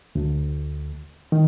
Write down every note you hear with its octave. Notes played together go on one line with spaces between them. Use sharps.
D2
D#3